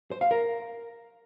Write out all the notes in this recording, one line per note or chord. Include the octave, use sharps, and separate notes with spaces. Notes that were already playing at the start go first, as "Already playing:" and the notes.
C5
F5
A#4